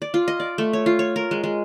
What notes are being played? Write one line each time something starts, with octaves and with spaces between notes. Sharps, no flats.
D5
F4
D#5
D5
A3
C#5
F4
C#5
A#4
G#3
G#3